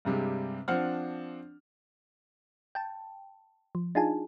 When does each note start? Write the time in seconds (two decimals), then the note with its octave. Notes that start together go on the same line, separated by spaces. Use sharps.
0.05 G2 C3 G3 G#3
0.68 F3 C4 D4 F#5 F6
2.75 G5 A5
3.75 F3
3.95 D4 D#4 F4 G#4 G#5 A5